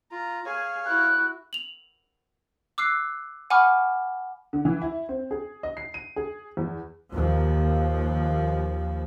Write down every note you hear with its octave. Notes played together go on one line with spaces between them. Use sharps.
F4 A#5
G#4 C#5 F5 G#5
E4 F#4 F#6
F7 F#7
D6 E6 F#6 C7
F#5 G#5 B5 C#6 D6 F6
D3
E3
E4
C4
G#4
D#5
C7
D#7
G#4
E2
D#2 F3